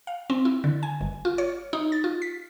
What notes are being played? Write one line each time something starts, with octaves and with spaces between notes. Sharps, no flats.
F5
C4
E4
D3
G#5
G1
F4
C#5
D#4
A6
F4
B6